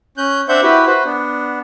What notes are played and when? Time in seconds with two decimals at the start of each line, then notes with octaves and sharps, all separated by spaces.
0.18 C#4 F#6 G6
0.48 C4 D4 C5 E5 F#5 G6
0.62 E4 F#4 G4 B4
0.86 F#4 B4 C5
1.05 B3 D4